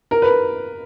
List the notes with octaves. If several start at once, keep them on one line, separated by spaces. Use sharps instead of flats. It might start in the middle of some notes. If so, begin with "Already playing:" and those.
A#4
B4